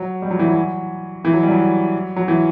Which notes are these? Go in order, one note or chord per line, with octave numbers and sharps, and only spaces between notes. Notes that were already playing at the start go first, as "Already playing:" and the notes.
Already playing: F#3
G3
F#3
E3
F#3
E3
F#3
G3
F#3
F#3
E3